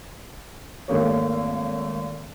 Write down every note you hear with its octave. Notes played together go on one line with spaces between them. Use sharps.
G#1 A3 A#3 C#5